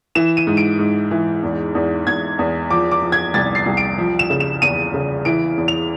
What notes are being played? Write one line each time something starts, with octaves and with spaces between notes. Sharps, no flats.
E3 E7
D#7
G#2
D7
G#2
E3
E2
E2
E2 G#6
E2
F3 D6
D6
F3
G#6
C2 A6
C7
C2
D7
F3
E7
C#3
E7
E2 D#7
C#3
E3 D7
E2
F7